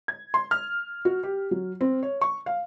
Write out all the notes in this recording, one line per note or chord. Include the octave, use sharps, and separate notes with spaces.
G#6
C6
F6
F#4
G4
F#3
C4
C#5
C#6
F5